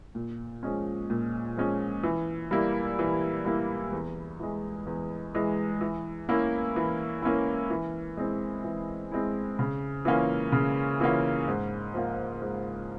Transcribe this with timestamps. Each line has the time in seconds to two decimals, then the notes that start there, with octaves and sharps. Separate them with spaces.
0.15 A#2
0.63 F3 G#3 C#4
1.10 A#2
1.57 F3 G#3 C#4
2.03 E3
2.51 G3 A#3 E4
2.99 E3
3.45 G3 A#3 E4
3.92 E2
4.39 E3 G#3
4.87 E2
5.35 E3 G#3
5.81 E3
6.29 A#3 C#4 E4
6.76 E3
7.22 A#3 C#4 E4
7.70 E3
8.17 G#3 C4 E4
8.64 E3
9.12 G#3 C4 E4
9.59 C#3
10.05 E3 A#3 C#4 F4
10.52 C#3
11.00 E3 A#3 C#4 F4
11.48 G#2
11.94 F3 A#3 F4
12.42 G#2